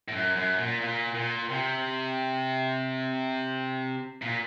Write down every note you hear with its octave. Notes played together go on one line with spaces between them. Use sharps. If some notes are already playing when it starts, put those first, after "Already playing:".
A2
F#2
F#2
A#2
A#2
A#2
C3
A#2